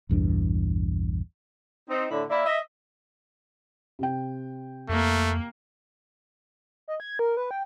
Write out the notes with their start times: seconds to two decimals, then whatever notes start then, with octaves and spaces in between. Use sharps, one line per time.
0.09 A#1 E2 G2 D4
1.90 C4 D#4
2.11 A2 D3 D4 E4
2.30 A#3 E4 D5 E5
2.46 D#5 E5
3.99 C3 C4 G5
4.89 F2 A3 A#3
6.88 D#5
7.00 G#6
7.19 A#4
7.37 B4
7.51 G5